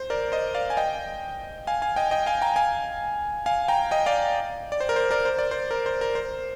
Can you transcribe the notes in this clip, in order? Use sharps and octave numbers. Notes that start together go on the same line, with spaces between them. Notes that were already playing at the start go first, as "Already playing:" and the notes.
Already playing: C5
A#4 D5
C5 D#5
D5 F5
G#5
D#5 G5
F5 G#5
F5 G#5
D#5 G5
D#5 G5
F5 G#5
G5 A#5
F5 G#5
F5 G#5
G5 A#5
D#5 G5
D5 F5
D5
C5
A#4
C5
A#4 D5
C5
D5
C5
A#4
C5
A#4
C5